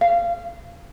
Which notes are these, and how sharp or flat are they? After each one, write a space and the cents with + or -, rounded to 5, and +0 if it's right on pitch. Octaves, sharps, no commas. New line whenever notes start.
F5 -25